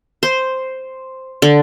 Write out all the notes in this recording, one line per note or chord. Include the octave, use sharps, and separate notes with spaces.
C5
D3